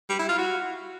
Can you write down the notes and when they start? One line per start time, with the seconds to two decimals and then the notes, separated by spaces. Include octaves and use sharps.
0.09 G3
0.19 E4
0.29 F4
0.38 F#4